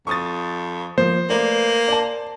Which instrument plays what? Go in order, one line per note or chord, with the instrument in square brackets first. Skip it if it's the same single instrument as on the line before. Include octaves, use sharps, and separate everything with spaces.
[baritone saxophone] F2 [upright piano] C#6 D#6 A6
[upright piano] F3 A#3 [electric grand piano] C5
[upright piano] A3 B4 D5 [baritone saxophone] A#3
[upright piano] D5 A5